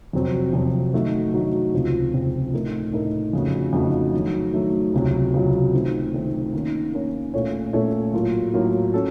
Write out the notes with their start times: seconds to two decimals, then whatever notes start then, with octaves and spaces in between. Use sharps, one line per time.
0.13 F2 C3 F#3 C4
0.53 F2 C3 F#3 C4
0.93 D#3 F#3 A3 D#4 F#4
1.34 D#3 F#3 A3 D#4 F#4
1.74 C#2 C3 F3 C4
2.13 C#2 C3 F3 C4
2.53 A2 A3 D#4 A#4
2.93 A2 A3 D#4 A#4
3.33 F2 C#3 A3 D#4 F#4
3.73 F2 C#3 A3 D#4 F#4
4.14 D#3 F#3 A3
4.53 D#3 F#3 A3
4.94 C#2 C3 F#3
5.34 C#2 C3 F#3
5.74 D#3 A3 C4
6.13 D#3 A3 C4
6.54 D#3 A#3 C#4
6.93 D#3 A#3 C#4
7.34 A#2 A3 C#4 A4 C#5
7.73 A#2 A3 C#4 A4 C#5
8.13 A2 F#3 A#3 F4
8.54 A2 F#3 A#3 F4
8.94 C#4 F#4 A4